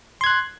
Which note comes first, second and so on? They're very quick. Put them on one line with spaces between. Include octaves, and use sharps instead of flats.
C6 G#6 F#6